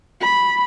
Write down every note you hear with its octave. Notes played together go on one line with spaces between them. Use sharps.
B5